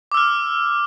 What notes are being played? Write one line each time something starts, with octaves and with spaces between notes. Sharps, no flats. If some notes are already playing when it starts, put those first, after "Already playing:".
D6 E6 F6